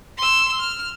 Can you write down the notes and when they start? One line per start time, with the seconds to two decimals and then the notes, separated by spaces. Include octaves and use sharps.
0.17 C6 E6
0.60 F6